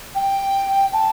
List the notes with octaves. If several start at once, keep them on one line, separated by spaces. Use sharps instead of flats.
G5
A5